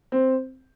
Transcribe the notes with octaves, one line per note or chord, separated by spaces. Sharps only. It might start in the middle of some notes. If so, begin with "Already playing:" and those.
C4